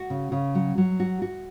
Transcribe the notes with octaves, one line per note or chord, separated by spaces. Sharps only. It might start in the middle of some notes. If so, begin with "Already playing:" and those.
Already playing: F#4
C#3
C#3
F#3
F#3
F#4
F#4